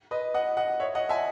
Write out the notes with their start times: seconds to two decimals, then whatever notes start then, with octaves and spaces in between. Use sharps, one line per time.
0.11 B4 D#5
0.34 D#5 F#5
0.57 D#5 F#5
0.80 C#5 E5
0.95 D#5 F#5
1.09 E5 G#5